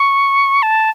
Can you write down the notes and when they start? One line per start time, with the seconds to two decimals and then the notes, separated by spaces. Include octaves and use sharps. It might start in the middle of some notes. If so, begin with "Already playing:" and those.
Already playing: C#6
0.63 A5